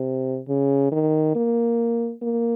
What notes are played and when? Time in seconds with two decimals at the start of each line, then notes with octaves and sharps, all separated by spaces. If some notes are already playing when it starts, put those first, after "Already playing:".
Already playing: C3
0.49 C#3
0.92 D#3
1.35 A#3
2.22 A#3